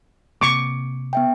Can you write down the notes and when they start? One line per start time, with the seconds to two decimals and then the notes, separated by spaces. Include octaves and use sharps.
0.41 C3 A#3 C#6 D6
1.13 B3 E5 G5